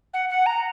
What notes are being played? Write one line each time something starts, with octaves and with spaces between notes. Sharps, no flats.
F#5
F#5
A#5